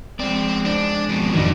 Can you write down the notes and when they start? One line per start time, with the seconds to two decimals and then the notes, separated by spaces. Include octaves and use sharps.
0.20 G#3 C4 D5
0.65 D4
1.09 F2 B2
1.34 F2 A2 D#3 F#3 C#4 D4 D#5